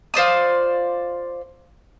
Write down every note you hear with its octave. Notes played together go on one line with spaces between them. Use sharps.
F4 C5 D5 D#6